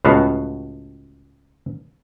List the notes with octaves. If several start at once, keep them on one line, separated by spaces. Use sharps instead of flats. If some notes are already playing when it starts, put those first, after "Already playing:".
C#2 A2 B3 F#4 F5